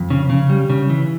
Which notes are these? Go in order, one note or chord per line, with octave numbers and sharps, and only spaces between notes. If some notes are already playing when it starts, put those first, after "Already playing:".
Already playing: F2
C#3
C#3
G3
C#3
E3